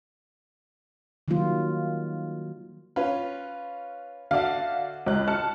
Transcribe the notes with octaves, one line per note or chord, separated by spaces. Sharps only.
D#3 F#3 G3 A#3 F4
C#4 F4 B4
D3 F#4 D5 E5 F5
C#2 F#6
A5 F6 C#7